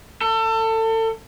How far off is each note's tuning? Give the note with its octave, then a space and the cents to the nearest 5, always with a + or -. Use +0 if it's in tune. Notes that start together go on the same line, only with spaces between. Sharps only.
A4 +30